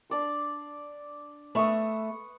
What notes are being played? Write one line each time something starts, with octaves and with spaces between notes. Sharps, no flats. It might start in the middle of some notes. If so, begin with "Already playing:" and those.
D4 D5 C6
A3 B4 E5 C#6 D#6